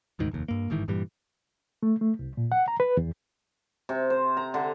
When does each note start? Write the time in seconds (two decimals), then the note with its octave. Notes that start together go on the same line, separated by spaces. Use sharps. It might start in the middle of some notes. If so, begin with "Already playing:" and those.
0.19 E1 D2 G#2 D#3
0.31 F1 D#2
0.48 G2 A#3
0.70 G1 G#2 D#3 E3
0.88 G2 A#2 E3 G3
1.83 A3
2.01 A3
2.19 C2
2.37 A#2
2.52 F#5
2.68 A#5
2.80 B4
2.97 E2
3.89 C3
4.10 C5
4.37 A#5
4.54 D3